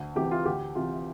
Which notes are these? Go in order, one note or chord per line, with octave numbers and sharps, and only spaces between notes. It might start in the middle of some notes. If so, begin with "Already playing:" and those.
Already playing: D2
C3 E3 G4
F4
D2 G4
C3 E3 F4